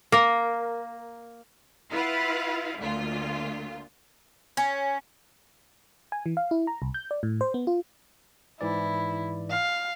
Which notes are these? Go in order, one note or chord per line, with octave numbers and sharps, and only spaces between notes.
A#3 A#4
E4 F4 B4 F5 F#5
D2 A#2 F4
C#4
G#5
E3
F5
E4
A#5
C2
G6
D5
A2
C5
B3
F4
G#2 E3 E4 D5
F5